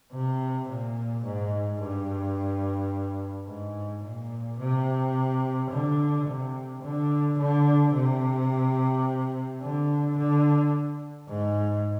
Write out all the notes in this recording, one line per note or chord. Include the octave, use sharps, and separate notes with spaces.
C3
A#2
G#2
G2
G#2
A#2
C3
D3
C3
D3
D3
C3
D3
D3
G#2